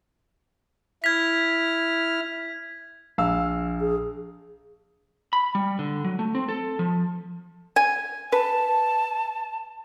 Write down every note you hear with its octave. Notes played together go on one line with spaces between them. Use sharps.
E4 F6 G#6 B6
A#1 F5 E6
G#4
B5
G3
D3
F#3
A3
C4
A4
F3
G#5
B4 A5